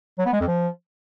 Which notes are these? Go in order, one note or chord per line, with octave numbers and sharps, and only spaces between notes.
F#3
B3
G#3
F2
F3